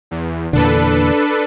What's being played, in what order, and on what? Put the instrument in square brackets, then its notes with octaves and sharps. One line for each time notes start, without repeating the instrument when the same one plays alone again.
[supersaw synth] E2
[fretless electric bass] E2 A#2 D3 [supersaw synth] D4 A4 B4